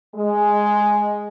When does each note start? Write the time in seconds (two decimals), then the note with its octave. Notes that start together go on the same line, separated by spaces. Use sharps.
0.15 G#3